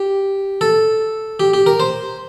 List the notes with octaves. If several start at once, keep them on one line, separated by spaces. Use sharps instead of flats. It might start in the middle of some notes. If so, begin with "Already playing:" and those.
Already playing: G4
A4
G4
G4
A#4
C5